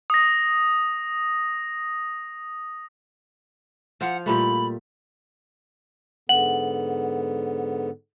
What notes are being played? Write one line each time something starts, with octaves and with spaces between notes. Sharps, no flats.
D#6 A#6
F3 F4 F5 F#5
A#2 G3 A3 B5
G#2 D3 B3 F#5 F#7